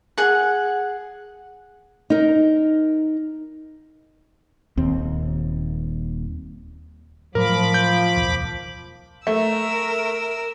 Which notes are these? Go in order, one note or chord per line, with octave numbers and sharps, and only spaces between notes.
G#4 F#5
D#4 A#4
D#1 D#2 C4
A2 F3 F#3 A#4 B5 D6
G6
D1 B1 E2
A3 A#4 E6